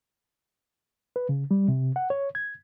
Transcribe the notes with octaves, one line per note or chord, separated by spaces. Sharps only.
B4
C#3
G3
C3
F#5
C#5
G#6